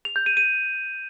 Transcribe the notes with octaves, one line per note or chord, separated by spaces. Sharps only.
F7
G6
D#7
D#7